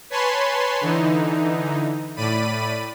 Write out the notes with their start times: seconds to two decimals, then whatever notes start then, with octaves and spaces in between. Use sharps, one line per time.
0.10 B4 C#5 G#5 A5 B5 C6
0.81 D3 E3 D#4
2.16 A2 D5 B5 D#7